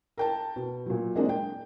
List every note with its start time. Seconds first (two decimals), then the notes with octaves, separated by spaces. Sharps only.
0.17 A#4 G5 A5
0.56 B2
0.86 A#2 F#3
1.16 G#3 A#3 C4 D4
1.29 G5